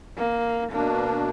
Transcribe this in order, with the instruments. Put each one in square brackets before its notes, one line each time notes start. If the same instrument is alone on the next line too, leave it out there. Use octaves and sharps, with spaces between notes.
[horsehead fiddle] A#3
[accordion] B2 D4 [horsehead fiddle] A#3